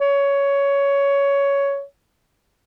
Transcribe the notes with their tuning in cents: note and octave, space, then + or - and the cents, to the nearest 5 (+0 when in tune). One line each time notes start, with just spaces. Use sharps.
C#5 +15